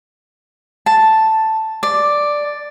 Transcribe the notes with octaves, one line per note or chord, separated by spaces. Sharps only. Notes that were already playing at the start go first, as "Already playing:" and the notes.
A5
D5